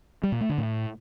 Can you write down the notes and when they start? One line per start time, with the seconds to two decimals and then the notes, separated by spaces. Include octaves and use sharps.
0.23 G3
0.32 A#2
0.41 A3
0.49 D3
0.58 A2